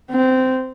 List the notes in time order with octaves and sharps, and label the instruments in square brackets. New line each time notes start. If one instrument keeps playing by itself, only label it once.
[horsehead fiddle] C4